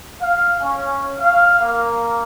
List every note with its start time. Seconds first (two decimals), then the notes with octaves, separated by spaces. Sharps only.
0.21 F5
0.61 C#4
1.19 F5
1.61 A#3